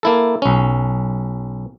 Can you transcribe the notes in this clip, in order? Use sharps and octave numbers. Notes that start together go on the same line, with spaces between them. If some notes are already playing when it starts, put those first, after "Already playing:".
A#3 E4 A4
B1 C#4